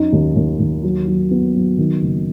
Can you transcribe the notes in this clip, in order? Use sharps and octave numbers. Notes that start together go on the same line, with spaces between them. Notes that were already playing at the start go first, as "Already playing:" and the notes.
Already playing: F#2 D#4
D#2
D#2
D#2
F#3
F#3
B3
F#3
D#3
F#1